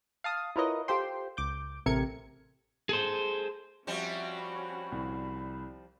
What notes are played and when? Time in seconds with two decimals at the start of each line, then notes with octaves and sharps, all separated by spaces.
0.24 F5 A5 D#6
0.56 E4 F4 A#4 B4 C#5 D#5
0.88 F4 G4 A4 C5 G5 C6
1.37 C#2 D6 G6
1.86 A1 C3 A4 A#4 G#6 C#7
2.89 G#4 A4 C5
3.87 F3 G3 C4 C#4 F#4 E5
4.38 B5
4.92 C2